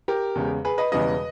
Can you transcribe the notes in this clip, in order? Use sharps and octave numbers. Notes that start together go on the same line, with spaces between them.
G4 A#4
E2 C#3 G#3
G#4 B4
B4 D#5
E1 E2 C#3 E3 G3 B4 D#5